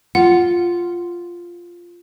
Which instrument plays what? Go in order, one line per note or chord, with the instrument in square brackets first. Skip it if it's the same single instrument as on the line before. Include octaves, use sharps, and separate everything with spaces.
[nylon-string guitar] F4 [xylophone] F#5